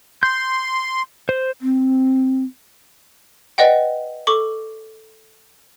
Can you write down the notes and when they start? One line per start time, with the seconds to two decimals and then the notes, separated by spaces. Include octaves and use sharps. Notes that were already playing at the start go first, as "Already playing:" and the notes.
0.23 C6 G6
1.29 C5
1.61 C4
3.58 B4 D5 D#5 F#5 G5
4.27 A4 C#6 D6